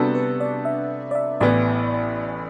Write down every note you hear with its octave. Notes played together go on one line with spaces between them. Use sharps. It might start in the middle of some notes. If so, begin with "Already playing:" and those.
Already playing: C3 G3 B3 D4 F#4 A4
B4
D5
E5
D5
E5
A1 A2 E3 B3 D5